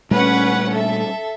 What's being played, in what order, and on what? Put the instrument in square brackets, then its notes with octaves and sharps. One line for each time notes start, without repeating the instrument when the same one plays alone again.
[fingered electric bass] A#2 G3 A3 [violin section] C#4 B4 F#5
[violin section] A4 E5